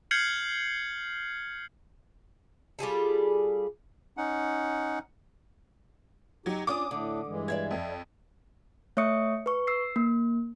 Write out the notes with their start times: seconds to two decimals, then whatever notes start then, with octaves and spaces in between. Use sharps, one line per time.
0.11 F6 G6 G#6 C7 C#7 F#7
2.79 G3 F4 G#4 A4
4.17 C#4 D#4 F#5
6.46 F#3 D#4 G4
6.67 C#4 D4 F4 D6 D#6
6.91 A2 D3 A3 D4
7.27 G2 E3 G#3
7.48 D5 E5 F5 G#6
7.71 F2
8.97 A3 C#5 E5 C#6 D#6 C#7
9.46 B4 C#6
9.67 E6 C7
9.96 A#3